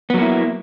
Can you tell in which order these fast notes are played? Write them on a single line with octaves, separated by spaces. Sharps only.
B3 F#3 A#3 E4